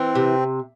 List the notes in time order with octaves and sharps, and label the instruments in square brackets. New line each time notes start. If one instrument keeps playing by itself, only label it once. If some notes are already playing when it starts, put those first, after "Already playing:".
Already playing: [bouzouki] E3 [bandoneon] C4
[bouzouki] C3